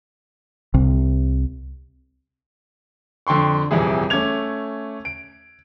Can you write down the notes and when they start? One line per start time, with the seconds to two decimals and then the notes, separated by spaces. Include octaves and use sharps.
0.74 C2 C3
3.27 F2 D3 G5 C6 C#6
3.71 D#1 F2 C3 E3 G#4
4.10 A3 C#4 D6 G#6 F7
5.05 D7